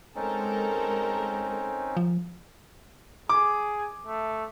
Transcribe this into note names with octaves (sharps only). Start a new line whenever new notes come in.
G#3 C4 C#4 D#4 A4 A#4
F3
G#4 D6
A3